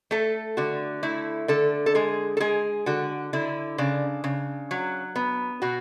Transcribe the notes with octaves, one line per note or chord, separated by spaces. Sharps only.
A3 A4
D3 F#4
A3 E4
D3 A4
A4
G#3 G#4
A4
G#3 G#4
D3 F#4
D3 E4
C#3 D4
C#3
F#3
B3
B2 F#4